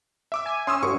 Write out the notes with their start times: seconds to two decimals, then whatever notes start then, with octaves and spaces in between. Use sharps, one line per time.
0.32 E5 D6 E6
0.46 G#5
0.67 C#4 C6 D#6 E6
0.83 G2 C#6